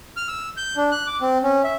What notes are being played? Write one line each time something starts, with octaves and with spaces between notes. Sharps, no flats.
F6
E6
G6
D4
F#6
D6
C4
C#4
E5